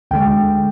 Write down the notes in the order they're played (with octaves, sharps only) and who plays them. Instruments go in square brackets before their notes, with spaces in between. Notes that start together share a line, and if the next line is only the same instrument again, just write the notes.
[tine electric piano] D2 D3 G#3 G5